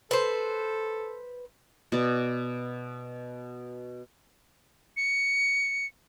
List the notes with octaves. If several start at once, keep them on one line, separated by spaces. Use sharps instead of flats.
A4 B4 C5
B2 D5
C#7